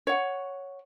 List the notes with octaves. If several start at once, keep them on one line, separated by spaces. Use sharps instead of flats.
C#5 F#5